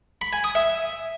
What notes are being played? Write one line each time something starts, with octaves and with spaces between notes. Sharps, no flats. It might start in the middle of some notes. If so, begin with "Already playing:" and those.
B5
G#5
D#6
E5